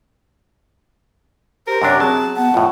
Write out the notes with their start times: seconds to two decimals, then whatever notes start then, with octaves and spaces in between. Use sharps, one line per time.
1.67 G4 A#4 C5
1.82 F#2 C3 D4 C#5
2.00 F#3 C4 G#4 A5
2.37 B3 F#5 A5
2.54 F2 A2 F4